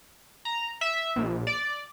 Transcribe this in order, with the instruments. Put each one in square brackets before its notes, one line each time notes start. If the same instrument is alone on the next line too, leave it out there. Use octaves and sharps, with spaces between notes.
[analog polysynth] A#5
E5
A#1
D5